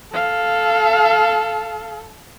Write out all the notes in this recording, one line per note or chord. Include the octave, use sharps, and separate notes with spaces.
A4 F5